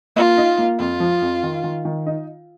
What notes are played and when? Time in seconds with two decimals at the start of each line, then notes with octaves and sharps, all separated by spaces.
0.16 A#3 F4
0.37 D#4
0.58 A#3
0.79 F2 F4
1.00 F3
1.22 F2
1.43 D#3
1.64 D#3
1.85 D#3
2.06 D#4